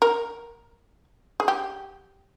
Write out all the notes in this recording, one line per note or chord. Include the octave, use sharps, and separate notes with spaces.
A#4
G#4
G4